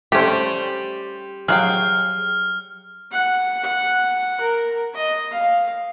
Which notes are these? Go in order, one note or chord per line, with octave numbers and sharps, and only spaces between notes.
G3 A3 C#4 G4 C5
F#3 G#4 F5 G5 F6
F#5
F#5
A#4
D#5
F5